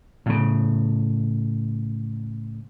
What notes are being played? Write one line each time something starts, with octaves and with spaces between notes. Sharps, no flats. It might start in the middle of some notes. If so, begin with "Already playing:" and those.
A2 C#3